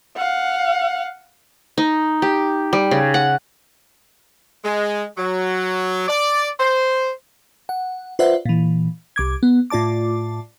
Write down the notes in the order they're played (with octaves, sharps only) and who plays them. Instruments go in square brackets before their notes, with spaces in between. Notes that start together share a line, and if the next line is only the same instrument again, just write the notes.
[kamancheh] F5 F#5
[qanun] D#4
G4
G3
C#3
F#5
[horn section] G#3
F#3
D5
C5
[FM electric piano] F#5
F4 B4 C5 D5 E5 F#5
A#2 E3
C2 D6 G#6
B3
A2 F4 D5 A5 D6